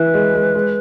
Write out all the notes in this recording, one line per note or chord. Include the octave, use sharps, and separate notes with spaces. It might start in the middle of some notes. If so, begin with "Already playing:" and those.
Already playing: E3 E4 B4
G#3
G#3
G#3